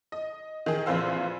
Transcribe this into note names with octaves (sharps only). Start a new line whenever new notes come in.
D#5
D#3 G#4
A#1 F2 E3 C5 F5 E6